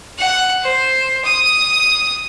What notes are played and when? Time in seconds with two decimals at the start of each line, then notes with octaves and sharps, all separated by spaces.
0.18 F#5
0.63 C5
1.25 D#6